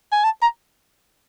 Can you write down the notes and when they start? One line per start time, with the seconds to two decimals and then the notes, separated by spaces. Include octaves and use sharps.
0.12 G#5
0.24 A5
0.42 A#5